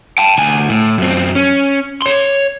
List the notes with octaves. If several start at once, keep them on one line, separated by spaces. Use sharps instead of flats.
G5 A5
D2 G#5
A2
F#2 C4
C#4
C#5 C6